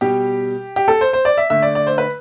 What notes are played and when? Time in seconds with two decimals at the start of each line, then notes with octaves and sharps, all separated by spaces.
0.01 B2 G3 G4
0.76 G4
0.88 A4
1.01 C5
1.13 C5
1.25 D5
1.37 E5
1.50 D3 A3 E5
1.63 D5
1.75 D5
1.87 C5
1.98 B4